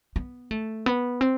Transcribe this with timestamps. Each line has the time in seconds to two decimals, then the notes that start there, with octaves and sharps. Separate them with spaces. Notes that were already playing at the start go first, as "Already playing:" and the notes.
0.16 B3
0.51 A3
0.86 B3
1.21 C4